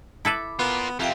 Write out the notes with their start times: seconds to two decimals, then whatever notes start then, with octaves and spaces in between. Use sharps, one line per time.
0.25 E4 A4 B4 B5 D6
0.59 B3 F4 A#4
1.00 F2 G3 C4 E5 F5 G5